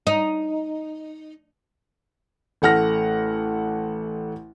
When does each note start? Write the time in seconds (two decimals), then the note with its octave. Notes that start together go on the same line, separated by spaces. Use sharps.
0.07 D#4
2.62 A1 A3 F#5 F6 A#6